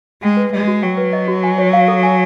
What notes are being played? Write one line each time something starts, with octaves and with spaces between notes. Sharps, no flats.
G#3 G5
B4
G#3 D#5
F#4
F#3 G5
B4
D#5
F#4
G#5
C#5
F5
A4
G#5